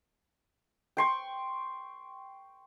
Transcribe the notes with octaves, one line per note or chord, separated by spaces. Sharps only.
G5 C6 C#6